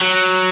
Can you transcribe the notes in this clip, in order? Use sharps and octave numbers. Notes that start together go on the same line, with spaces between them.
F#3